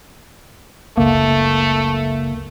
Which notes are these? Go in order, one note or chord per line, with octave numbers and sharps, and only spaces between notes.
F#1 C#2 A3 A#3